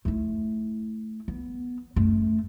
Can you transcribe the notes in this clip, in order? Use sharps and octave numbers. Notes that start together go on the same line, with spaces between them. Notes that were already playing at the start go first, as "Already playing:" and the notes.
A3 E4
B3
F#2 A3